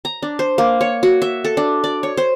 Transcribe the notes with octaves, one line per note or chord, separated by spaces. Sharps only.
A#5
D4
C5
A#3
C#5
F#4
E5
A4
D4
D5
C#5
C5